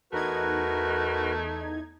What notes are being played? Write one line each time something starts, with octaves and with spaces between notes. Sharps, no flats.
E2 A3 D#4 F#4 A#4 B4 G#6